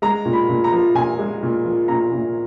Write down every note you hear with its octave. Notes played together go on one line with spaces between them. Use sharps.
G#3 A#5
A#2
B5
A#2
A#5
F3
A#2 G#5
G#3
A#2
F3
A#2 A#5
A#2